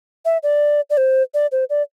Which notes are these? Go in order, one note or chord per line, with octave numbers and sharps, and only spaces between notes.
E5
D5
D5
C5
D5
C5
D5